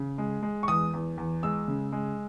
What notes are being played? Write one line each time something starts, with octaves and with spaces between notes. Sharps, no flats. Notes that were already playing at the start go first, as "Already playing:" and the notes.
Already playing: C#3
G#3
G#3
C#6
E2 D#6
E2
E2
G#3 E6
C#3
G#3